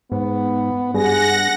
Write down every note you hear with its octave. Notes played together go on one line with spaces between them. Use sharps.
G#2 B3
G2 G#4 F#5 A#6